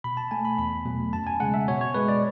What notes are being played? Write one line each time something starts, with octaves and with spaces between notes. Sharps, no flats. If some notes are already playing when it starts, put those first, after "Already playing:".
B2 B5
A5
A3 G#5
B5
E2 B5
B2 F#3 A3
F#2 A5
G#5
C#3 G#3 F#5
E5
B2 C#5
C#5
G#3 B4
D5